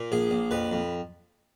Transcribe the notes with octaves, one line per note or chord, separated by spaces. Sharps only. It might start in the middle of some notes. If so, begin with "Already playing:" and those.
Already playing: A#2
A#1 G#4
A#1
F2 B4
F2